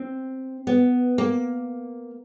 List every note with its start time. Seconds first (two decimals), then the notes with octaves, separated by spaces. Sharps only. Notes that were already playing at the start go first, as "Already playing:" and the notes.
Already playing: C4
0.67 B3
1.18 A#3